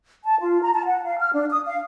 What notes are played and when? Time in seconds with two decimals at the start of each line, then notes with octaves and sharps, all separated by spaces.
0.24 A5
0.40 F4
0.61 A#5
0.74 A5
0.86 F#5
1.05 F5
1.19 F6
1.33 D4
1.50 D#6
1.66 F5